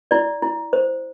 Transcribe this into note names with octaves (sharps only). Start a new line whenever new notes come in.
E4 D5
E4
C5